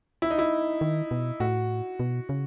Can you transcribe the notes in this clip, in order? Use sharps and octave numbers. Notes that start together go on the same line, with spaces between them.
E4
D#4
E4
D#3
B2
A2 F#4
B2
C#3